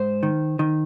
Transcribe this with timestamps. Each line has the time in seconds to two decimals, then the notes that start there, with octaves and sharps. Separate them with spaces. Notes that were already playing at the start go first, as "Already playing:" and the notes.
Already playing: G#2 C5
0.23 D#3
0.59 D#3